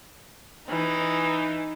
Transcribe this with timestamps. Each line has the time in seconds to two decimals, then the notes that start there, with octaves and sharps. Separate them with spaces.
0.69 E3 D#4